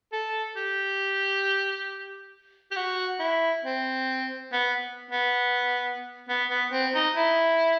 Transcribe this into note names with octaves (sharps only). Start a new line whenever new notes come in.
A4
G4
G4
F#4
E4
C4
B3
B3
B3
B3
C4
D#4
E4